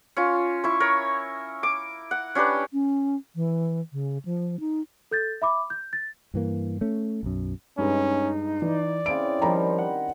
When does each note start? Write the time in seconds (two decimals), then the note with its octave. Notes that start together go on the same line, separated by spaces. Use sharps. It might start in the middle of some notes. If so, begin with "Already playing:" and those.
0.17 C#4 F4
0.64 E4 C#6
0.80 A#4 C#5
1.63 D6
2.11 F#5
2.35 C#4 D4 G4 B4
2.72 C#4
3.35 E3
3.92 C#3
4.25 F3
4.60 D#4
5.11 A4 G6 A6
5.42 E5 B5 D6
5.70 G6
5.93 A6
6.34 G2 E3 A#3
6.81 A3 C#4
7.23 B1 F#2
7.78 G2 G#3 C#4 D#4
8.62 E3 D5
9.06 C#3 C4 E4 D7
9.41 D#3 F3 G3 G5 A#5 B5
9.78 F#5